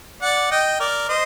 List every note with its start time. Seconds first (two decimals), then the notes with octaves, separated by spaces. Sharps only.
0.22 D5 F#5
0.51 D#5 G5
0.80 A#4 D5
1.09 C5 D#5